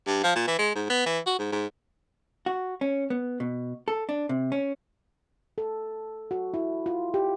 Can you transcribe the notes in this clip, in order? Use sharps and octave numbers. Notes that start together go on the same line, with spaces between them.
G2
F3
A#2
E3
G#3
G#2
B3
E3
F#4
G#2
G#2
F#4
C#4
B3
B2
A4
D4
C3
C#4
A4
F#4
E4
F4
G4